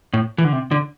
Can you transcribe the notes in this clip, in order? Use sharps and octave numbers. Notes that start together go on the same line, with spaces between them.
A2
E3
D3
C3
D3